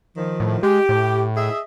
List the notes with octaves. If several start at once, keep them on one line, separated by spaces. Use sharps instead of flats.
D#3 F3
A2
G#3 G4
A2
G#4 D#5 E5